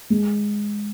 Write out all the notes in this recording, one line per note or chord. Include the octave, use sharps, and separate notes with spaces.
G#3